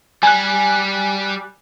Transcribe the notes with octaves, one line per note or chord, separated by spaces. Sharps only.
G3 G#5 F#6